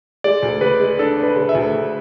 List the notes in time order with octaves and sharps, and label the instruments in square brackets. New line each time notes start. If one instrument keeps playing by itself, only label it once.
[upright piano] G#3 [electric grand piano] D5
[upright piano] D2
[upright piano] C#3 [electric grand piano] B4
[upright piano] G#3
[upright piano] D4 [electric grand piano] A4
[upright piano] D4
[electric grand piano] B4
[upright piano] C#3
[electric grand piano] E5
[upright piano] D2
D2